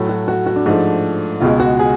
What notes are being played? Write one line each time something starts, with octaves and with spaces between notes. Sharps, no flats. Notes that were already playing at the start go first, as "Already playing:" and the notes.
Already playing: A2 F#3 A3
F#4
F#4
F#4
D4
G#2 F3 A3
C#2 B2 G#3 F4
F#4
G#4